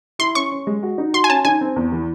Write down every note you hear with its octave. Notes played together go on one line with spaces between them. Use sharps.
E4 C6
C#4 C#6
C#4
G#3
F#4
D#4
F#4 C6
G#5
C#4 A5
D#4 G#5
C4
E2
E3